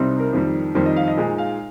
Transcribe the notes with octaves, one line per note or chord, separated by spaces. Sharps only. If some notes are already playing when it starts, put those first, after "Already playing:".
Already playing: C2 C3 G3 C4 D#4
A#4
F2 D#3 G3
F2 D#3 G3 C5
D#5
F5
D#5
A#2 G#3 D#4
F5